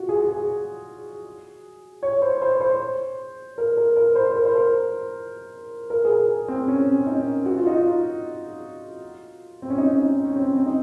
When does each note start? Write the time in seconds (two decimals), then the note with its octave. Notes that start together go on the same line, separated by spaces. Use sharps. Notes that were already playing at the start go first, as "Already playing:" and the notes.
Already playing: F4 F#4
0.09 G#4
0.28 G#4
2.03 C#5
2.22 C5
2.42 C5
2.61 C5
3.58 A#4
3.77 A#4
3.96 A#4
4.15 C5
4.36 A#4
4.45 C5
4.55 A#4
5.90 A#4
6.05 G#4
6.10 A#4
6.48 C4
6.68 C#4
7.01 C#4
7.07 D#4
7.45 F#4
7.56 F4
7.67 D#4
7.78 F4
9.62 C4
9.70 C#4
9.78 D#4
9.97 D#4
10.24 C#4
10.36 C4
10.56 C4
10.66 D#4